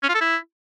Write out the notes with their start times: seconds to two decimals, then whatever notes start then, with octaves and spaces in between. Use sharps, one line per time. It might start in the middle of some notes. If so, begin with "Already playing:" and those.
0.03 C#4
0.09 F4
0.15 A4
0.20 E4